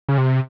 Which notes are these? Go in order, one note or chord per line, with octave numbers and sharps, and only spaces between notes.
C#3
C3